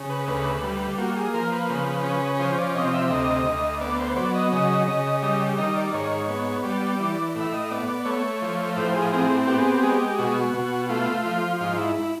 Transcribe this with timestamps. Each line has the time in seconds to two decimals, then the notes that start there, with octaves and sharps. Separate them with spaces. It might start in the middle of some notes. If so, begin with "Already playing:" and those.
Already playing: C#3
0.10 B4
0.28 D2 B4
0.63 G3
0.98 A#3 F#4
1.16 G#4
1.34 F3 A#4
1.52 B4
1.70 C#3
2.04 C#4
2.39 F3 C5
2.58 D5
2.75 C3 D#5
2.94 E5
3.10 D2 D#5
3.46 D2
3.81 B3 D5
4.00 C5
4.16 F#3 D5
4.35 D#5
4.52 C#3 D#5
4.88 C#3
5.22 G3 D#5
5.58 D#3 D#5
5.76 D5
5.93 G#2 C#5
6.29 B3
6.64 G3 D5
7.00 E3
7.35 A2
7.40 E5
7.54 D#5
7.71 B3 D5
7.88 D5
8.05 A3 C#5
8.42 F3
8.76 A2 C5
8.94 G#4
9.12 C4 G#4
9.47 B3 G4
9.58 G#4
9.69 G4
9.79 G#3 G#4
9.89 G4
10.18 B2 F#4
10.54 B2
10.89 A3 F4
11.25 F3
11.61 G#2 F4
11.77 E4
11.96 E4